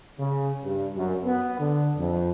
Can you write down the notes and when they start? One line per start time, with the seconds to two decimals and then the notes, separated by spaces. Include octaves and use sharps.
0.19 C#3
0.63 G2
0.95 F#2
1.25 B3
1.60 D3
1.98 F2